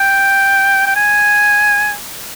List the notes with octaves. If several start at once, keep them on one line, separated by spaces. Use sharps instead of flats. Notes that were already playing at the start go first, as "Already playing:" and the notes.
Already playing: G5
G5
G#5